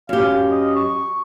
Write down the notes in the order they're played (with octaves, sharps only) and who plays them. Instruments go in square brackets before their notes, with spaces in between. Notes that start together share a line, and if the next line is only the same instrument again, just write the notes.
[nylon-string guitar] F#2 G4 [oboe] F5
[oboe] D#5
C#6